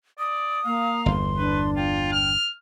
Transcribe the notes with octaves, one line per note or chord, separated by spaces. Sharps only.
D5 D#6
A#3 F5
G1 E2 C6
D4 B4
F4 G5
F6